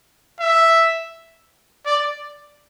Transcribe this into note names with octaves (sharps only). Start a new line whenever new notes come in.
E5
D5